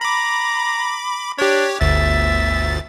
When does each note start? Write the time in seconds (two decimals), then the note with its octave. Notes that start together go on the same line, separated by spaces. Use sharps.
0.01 A#5 B5 D6
1.39 D4 G4 C#5
1.81 G1 D2 E5 A6